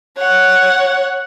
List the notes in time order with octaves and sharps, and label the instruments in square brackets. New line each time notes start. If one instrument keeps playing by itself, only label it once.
[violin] C#5 F#5